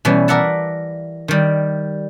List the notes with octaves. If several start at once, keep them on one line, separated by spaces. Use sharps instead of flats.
B2 E3 G3 C#4
A#4 D5 E5 F#5 A5
D#3 G3